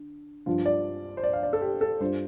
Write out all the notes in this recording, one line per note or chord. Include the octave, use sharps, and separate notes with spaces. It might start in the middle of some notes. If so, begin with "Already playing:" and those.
Already playing: D3
G2 F3 D4 F4
D5
C5
D5
F5
D5
A4
G4
A4
G2 G3 D4 F4 C5